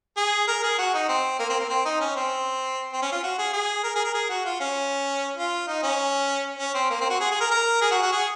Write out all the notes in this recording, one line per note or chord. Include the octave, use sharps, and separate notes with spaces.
G#4
A#4
G#4
F#4
D#4
C4
A#3
C4
A#3
C4
D#4
C#4
C4
C4
C#4
F4
F#4
G#4
G#4
A#4
G#4
A#4
G#4
F#4
F4
C#4
F4
D#4
C#4
C#4
C4
A#3
C4
F#4
G#4
G#4
A#4
A#4
G#4
F#4
F#4
G#4